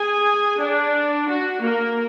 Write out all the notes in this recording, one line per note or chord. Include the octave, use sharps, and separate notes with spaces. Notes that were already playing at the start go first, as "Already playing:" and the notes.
Already playing: G#4 G#5
D4 D5
F#4
A#3 A#4